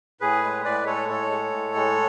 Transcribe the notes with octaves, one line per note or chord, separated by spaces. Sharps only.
A2 G#4 B4
G#3
A2 B4 D5
G#3 A4 C#5
A2 A4 C#5
G#3
A2
G#3